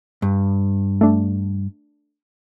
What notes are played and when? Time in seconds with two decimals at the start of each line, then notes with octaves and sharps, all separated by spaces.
0.22 G2
1.01 A3 D4